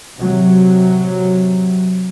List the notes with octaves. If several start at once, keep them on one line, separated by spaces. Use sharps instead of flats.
C3 F#3